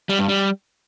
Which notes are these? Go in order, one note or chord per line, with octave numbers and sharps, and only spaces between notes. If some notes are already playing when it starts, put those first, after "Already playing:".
G3
G2
G3